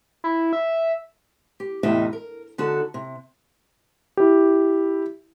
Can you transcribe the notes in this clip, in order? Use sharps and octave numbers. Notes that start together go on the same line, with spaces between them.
E4
E5
G4
E2 A2 C3 D#4 D#5 E5
A#4
D3 D#4 F#4 A4 A5
C3
E4 G4